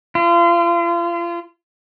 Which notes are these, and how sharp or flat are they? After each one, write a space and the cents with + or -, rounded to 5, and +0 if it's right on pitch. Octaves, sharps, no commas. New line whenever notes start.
F4 -35